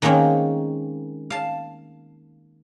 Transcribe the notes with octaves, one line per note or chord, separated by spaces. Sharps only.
D#3 G#3 A#3 C4 C#4
F5 A5